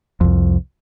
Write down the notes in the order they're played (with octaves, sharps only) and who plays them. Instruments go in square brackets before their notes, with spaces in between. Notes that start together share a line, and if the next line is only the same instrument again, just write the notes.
[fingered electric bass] C2 F2